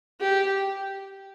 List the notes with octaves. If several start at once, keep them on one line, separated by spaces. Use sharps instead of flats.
G4